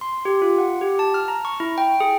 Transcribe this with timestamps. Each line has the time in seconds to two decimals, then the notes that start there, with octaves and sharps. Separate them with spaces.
0.01 C6
0.25 G4
0.42 F4
0.58 F#5
0.81 G4
0.99 A5
1.14 F6
1.28 A#5
1.45 C#6
1.60 E4
1.78 G5
2.00 G#4